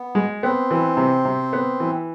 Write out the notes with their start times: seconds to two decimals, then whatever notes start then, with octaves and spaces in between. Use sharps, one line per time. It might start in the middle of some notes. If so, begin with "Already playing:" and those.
Already playing: B3
0.15 G#3
0.43 B3 C4
0.71 E3
0.97 C3
1.25 C3
1.53 B3
1.80 E3